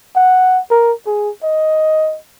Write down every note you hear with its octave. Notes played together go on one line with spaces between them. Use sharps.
F#5
A#4
G#4
D#5